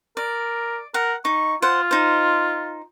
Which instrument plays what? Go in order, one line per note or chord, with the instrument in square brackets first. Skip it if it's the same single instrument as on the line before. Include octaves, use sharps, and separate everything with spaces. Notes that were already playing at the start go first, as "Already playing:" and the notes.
[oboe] A#4 [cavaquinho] D5
[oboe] A#4 [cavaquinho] F#5
[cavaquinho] D#4 [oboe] C#6
[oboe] F4 [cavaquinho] C5 F#5
[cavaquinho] D#4 C5